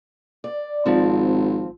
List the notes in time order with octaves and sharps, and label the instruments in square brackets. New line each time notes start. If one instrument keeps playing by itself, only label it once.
[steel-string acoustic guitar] D5
[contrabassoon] G#1 [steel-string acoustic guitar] F3 C4